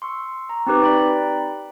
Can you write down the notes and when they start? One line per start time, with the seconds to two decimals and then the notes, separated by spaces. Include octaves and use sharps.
0.02 C6 C#6 E6
0.49 A#5
0.66 C4 D#4 G4 B4
0.82 D5 G5 A#5 B5